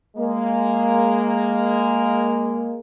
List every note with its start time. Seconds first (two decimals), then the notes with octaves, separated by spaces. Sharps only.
0.17 G#3 A#3